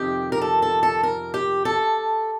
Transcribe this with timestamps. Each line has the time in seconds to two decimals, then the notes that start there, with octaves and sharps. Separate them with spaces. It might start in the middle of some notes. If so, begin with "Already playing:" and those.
Already playing: F2 C3 D#3 G4
0.32 A#4
0.41 A4
0.62 A4
0.83 A4
1.03 A#4
1.34 G4
1.65 A4